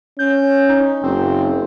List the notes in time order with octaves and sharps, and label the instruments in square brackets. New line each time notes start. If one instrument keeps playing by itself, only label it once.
[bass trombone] C#4 [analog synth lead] G6
[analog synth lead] D#4
[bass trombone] F#1 [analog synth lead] C4